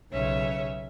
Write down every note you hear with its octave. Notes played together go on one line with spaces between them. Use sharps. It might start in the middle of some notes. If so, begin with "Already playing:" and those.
B1 C#3 C#4 E5